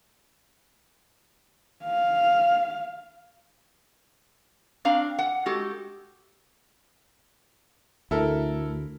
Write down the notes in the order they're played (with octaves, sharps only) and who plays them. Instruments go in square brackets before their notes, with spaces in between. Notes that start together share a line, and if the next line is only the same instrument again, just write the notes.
[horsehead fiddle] F5
[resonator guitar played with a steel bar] C4 D4 F5 A#5
F#5
G#3 F#4 G4 A4
[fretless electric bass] D2 [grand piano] E4 A4 A#4